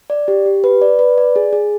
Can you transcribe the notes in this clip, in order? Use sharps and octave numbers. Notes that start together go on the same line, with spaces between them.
D5
G4
G4
B4
D5
B4
D5
G#4
G#4